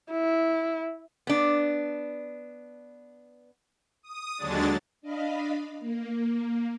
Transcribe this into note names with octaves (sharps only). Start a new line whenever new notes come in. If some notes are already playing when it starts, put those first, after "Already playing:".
E4
B3 D4
D#6
D#2 D3 F#3 G#3 D4 A6
D4 D#5 F5 B5
A#3